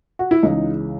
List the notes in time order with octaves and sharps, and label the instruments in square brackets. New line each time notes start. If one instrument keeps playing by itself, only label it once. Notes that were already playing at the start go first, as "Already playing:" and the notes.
[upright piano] F#4
E4
C#2 C#3 E3 D#4